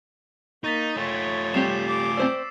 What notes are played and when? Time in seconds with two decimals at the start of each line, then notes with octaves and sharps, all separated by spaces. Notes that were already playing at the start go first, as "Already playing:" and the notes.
0.64 A#3 D#4 C#6 A6 B6
0.96 A3 F4 C#5
1.54 G3 C4 G4 D6 C7 E7
1.87 D6 A6
2.17 C4 C5 D5 E6